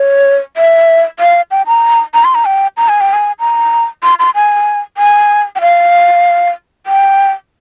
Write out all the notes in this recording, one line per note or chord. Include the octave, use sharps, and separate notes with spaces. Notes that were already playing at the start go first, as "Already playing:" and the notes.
Already playing: C#5
E5
F5
G5
A#5
A#5
C6
A#5
G5
A#5
G#5
G5
G#5
A#5
C6
C6
G#5
G#5
G5
F5
G5